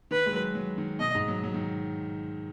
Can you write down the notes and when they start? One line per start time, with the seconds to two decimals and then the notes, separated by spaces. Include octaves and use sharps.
0.11 D#3 B4
0.26 G#3
0.33 F#3
0.55 F#3
0.78 D#3
0.99 B2 D#5
1.15 G#2
1.28 F#3
1.44 F#3
1.54 D#3